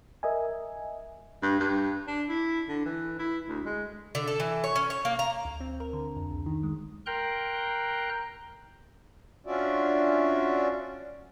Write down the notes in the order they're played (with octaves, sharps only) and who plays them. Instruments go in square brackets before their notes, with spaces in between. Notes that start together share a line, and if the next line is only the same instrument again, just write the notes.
[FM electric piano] A#4 D#5 E5 G#5
[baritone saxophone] G2
G2
D4
E4
D3
E3
E4
D2
G#3
[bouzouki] D3
A4
E3
C#5
C#4
C#5
A#3
A#5
[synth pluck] D2
C4
A#4
D3
F2
C#2
D#3
G#3
[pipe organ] A#4 G5 A#5 C6 F#6
[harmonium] C#4 D4 F4 F#4 D5 E5